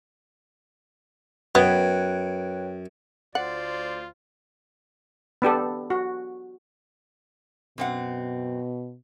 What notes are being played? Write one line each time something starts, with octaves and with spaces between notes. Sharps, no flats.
F#2 B3 B4 C#5 G5
D2 A3 F4 C5 D5 F#5
B3 D4 G4 A4
F#4
F#2 B2 C4 F#5